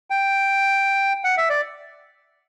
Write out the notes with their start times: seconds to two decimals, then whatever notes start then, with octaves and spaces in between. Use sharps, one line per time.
0.10 G5
1.24 F#5
1.37 E5
1.50 D5